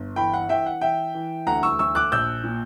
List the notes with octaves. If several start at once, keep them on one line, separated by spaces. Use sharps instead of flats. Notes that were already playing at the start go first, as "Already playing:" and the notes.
Already playing: G1
E3 G5 B5
F#5
E3 E5 G5
F#5
E3 E5 G5
E3
D2 F#5 A#5
C#6 E6
D2 C#6 E6
D6 F#6
A#1 E6 G6
A#2